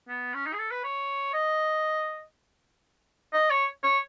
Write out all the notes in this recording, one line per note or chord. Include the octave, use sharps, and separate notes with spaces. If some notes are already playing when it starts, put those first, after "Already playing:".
B3
C#4
D#4
G#4
A4
B4
C#5
D#5
D#5
C#5
C#5